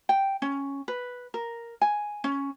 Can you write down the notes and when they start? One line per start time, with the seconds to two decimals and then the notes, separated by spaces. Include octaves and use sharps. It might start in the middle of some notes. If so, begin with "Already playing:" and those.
0.09 G5
0.42 C#4
0.88 B4
1.34 A#4
1.81 G#5
2.24 C#4